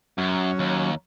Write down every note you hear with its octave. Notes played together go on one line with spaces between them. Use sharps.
F#2 F#3 C#4
D#2